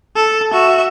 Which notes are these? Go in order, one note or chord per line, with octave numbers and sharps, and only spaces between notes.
A4
F#4 E5